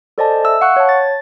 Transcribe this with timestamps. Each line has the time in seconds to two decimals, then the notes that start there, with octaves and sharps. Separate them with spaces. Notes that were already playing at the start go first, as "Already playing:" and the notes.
0.18 A4 C5 D5 D#5 G#5 A5
0.45 E5 E6
0.61 F5 F#5 C#6 F#6
0.76 C#5 A5
0.89 A6